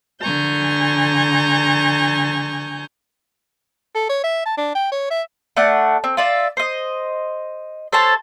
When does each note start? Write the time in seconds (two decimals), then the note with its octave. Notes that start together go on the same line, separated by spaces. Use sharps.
0.22 D3 G#5 A#5 C#6 G6
3.95 A4
4.09 C#5
4.23 E5
4.46 A5
4.57 D4
4.75 G5
4.92 C#5
5.11 E5
5.57 A3 D4 F#5
6.04 C4
6.17 F4 D5 E5
6.57 C5 D#5
7.93 A4 C5 C#5 A5